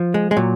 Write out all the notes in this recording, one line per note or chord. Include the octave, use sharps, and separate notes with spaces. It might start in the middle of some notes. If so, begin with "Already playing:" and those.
Already playing: F3
G#3
G#3
A#2 F#3